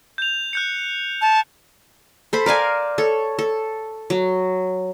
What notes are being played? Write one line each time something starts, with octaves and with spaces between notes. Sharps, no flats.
G6 F7
F#6 G6 C#7
A5
A4 C5 B5
A#4 D5 F5 G#5
A4 C#5
A4
F#3